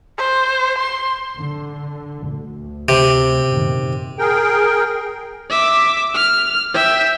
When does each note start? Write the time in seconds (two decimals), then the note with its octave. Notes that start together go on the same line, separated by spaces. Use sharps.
0.18 C5
0.78 C6
1.37 D3
2.29 D2
2.89 C3
3.45 F#2 A#2 D#3
4.19 G#4 A#4 G5
5.50 E5 D6
6.15 F6
6.74 E5 G5